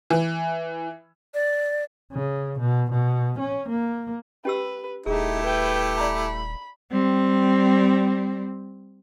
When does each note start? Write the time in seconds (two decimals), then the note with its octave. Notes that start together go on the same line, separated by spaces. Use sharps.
0.10 E3
1.34 D5
2.13 C#3
2.59 B2
2.91 B2
3.39 C#4
3.69 A#3
4.45 C#4 G4 B4 E6
5.06 D#1 A3 D#4 E4 G4 G#4
5.43 B4 G5
6.00 D5 A#5 B5
6.91 G3 C4